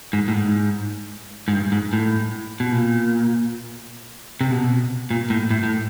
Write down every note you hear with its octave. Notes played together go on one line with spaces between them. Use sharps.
G#2
A2
G#2
G#2
G2
G#2
A2
B2
A#2
C3
B2
A#2
A2
A2
A2